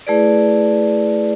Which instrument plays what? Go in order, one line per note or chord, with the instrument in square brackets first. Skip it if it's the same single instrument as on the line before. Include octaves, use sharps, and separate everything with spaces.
[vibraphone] A3 E4 G#4 B4 D5